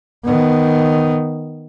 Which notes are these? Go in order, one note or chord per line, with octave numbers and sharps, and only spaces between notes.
D#3 B3